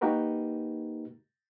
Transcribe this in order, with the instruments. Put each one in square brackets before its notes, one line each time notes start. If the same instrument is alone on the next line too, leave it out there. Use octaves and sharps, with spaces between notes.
[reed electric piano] A#3 D#4 F#4 G4 A#4 B4